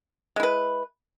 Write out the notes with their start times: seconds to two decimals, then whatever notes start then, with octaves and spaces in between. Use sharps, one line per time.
0.36 G#3
0.40 E4
0.43 B4